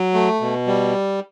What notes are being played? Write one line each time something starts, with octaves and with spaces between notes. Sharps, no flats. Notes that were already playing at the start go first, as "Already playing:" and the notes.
Already playing: F#3
A3
B2
G3